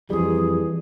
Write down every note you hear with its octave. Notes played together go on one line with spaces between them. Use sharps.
F2 E3 G3 G#4